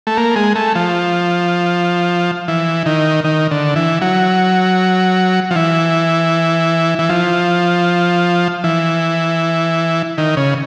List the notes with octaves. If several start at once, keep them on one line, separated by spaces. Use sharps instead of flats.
A3
A#3
G#3
A3
F3
E3
D#3
D#3
D3
E3
F#3
F3
E3
E3
F3
E3
D#3
C#3